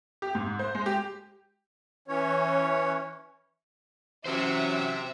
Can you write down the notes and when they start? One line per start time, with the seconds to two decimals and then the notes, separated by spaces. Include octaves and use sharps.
0.22 G4
0.35 G#2
0.59 C5
0.75 G#3
0.86 G4
2.08 E3 C#4 C#5
4.26 E3 F#3 C#4 G4 C5 E5